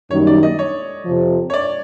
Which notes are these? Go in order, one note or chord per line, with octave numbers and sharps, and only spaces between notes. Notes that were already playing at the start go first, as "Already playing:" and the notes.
F#2 D#3 G3 A#3 D#4 C#5
D5
D#5
C#5
F2 C3 F3
C#5
D5